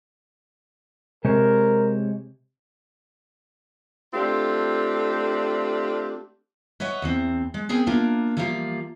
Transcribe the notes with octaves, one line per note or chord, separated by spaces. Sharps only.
C3 G#3 A#4 C5 C#5
A3 C4 D4 F4 G4
B4 C#5 D#5 E5 F#5
E2 E3 C4
G#3
B3 C4 G#4 A#4 G5 G#5
A#3 D4 F4 A#4 E5
E3 F3 G3 A#3 F4